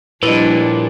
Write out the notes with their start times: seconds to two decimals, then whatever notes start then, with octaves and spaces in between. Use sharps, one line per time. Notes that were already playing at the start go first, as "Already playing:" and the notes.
0.23 A#2 F3 G3 D4 E4 B4 D#5